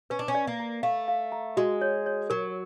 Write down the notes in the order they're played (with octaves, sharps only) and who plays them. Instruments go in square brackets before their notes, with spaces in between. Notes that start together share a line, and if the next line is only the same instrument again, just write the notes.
[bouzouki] C#4 [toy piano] B4
[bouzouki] D4
C#4
[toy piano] D5
[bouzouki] A#3
[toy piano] A#5
[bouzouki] A3 [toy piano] F5
[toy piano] F5
A#5
[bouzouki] G#3 [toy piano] F#4
[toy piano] C#5
C#5
[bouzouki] F#3 [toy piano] A#4